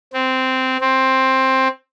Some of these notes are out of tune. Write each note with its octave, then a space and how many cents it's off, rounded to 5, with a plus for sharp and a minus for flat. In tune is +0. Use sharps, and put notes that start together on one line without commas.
C4 -10
C4 +10